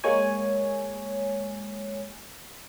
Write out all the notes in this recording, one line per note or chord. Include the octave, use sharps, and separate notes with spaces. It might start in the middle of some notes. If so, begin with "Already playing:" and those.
G#3 A#3 C#5 G#5